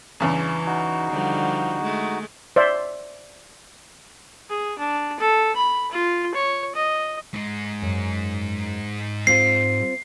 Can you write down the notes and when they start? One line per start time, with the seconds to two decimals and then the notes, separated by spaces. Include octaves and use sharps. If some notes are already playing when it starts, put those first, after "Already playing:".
0.20 E2 G2 C#3 E3
0.66 D#4 F#4
1.11 D3 F3 G3
1.82 G#3 A3
2.56 C5 D5 E5
4.50 G#4
4.79 D4
5.20 A4
5.56 B5
5.91 F4
6.35 C#5
6.75 D#5
7.33 G#2 G#3
7.82 F#2
9.27 C4 F4 C5 C7